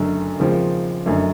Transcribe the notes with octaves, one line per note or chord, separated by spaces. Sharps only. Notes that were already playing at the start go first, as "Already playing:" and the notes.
Already playing: F#1 F#2 D3 F#3 A3
D#2 C#3 F3 G#3 C4
F#1 F#2 D3 F#3 A3